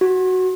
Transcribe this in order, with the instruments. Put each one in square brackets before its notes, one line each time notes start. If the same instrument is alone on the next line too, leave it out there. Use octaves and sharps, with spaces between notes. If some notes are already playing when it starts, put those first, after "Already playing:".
[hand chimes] F#4